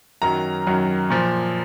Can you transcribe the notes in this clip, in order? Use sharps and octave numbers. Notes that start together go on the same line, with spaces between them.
F#2 D#3 F#3 A#5
F#2 D#3 F#3
A#2 F3